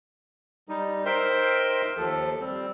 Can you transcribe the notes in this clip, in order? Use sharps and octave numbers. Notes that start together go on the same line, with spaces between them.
G3 D#4
D#4 A#4 C5 E5 G5 C6
D#2 F3 A4
G3 C4